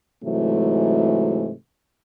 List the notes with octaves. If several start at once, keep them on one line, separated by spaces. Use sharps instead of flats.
G#2 C3 E3 F#3 G#3 A3